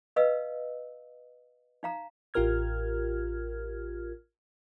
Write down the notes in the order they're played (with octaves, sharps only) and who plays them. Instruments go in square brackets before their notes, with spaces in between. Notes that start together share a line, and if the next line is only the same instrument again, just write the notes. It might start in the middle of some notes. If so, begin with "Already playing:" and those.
[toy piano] B4 D#5 F5 E6
D#4 F5 A#5
[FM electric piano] A1 F4 G4 A#4 F6 G#6